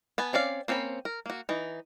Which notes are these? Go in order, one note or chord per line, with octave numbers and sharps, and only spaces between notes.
B3 B4 G#5 A5
C4 C#4 D5 F5
A#3 C4 C#4 C5 B5
A#4
A#3 F#4
E3 D#4